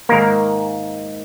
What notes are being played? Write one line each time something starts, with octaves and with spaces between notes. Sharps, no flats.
G#2 D#3 A#3 A#4